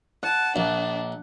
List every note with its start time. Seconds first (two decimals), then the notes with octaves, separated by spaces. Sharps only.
0.23 F#5 A5
0.56 A#1 D4